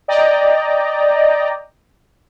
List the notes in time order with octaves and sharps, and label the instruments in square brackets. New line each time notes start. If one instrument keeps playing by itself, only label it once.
[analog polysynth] D5 D#5 G5 A#5